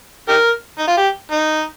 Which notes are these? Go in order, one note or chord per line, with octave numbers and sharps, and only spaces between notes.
D#4 G4 A#4
D#4
F4
G4
D#4